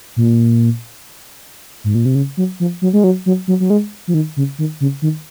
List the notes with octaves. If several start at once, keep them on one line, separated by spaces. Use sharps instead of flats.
A#2
G#2
A#2
C3
C#3
F#3
F3
F#3
G#3
F#3
F#3
F#3
F#3
G#3
F3
D#3
C#3
D#3
C#3
D#3